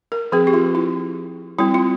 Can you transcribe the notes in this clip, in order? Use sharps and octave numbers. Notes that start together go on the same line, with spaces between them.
A#4
F3 C4 G#4
G4
F4
E4
G3 C4 E4
F4